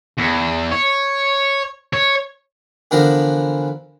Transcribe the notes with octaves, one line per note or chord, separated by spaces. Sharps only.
E2
C#5
C#5
D3 E3 F3 B3 D4 A#4